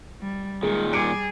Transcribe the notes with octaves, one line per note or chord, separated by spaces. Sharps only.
G3
A#2 D#3 G#3 G#4
G3 G#4 D6 C#7 D7